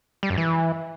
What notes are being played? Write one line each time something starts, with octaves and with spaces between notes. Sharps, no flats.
G3
F#2
E3